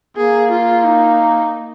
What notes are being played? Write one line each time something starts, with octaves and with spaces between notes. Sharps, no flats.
A#3 G#4
F4
D#4